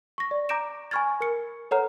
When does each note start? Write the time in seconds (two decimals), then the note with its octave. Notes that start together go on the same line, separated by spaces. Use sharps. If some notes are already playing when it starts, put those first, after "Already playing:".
0.18 C#6 A#6
0.31 D5
0.49 A#5 D6 G6 A#6 D7 E7
0.91 G#5 B5 C#6 F6 G#6 A6
1.20 A#4 F6 C#7
1.71 A4 B4 C#5 F#5 A#5 F6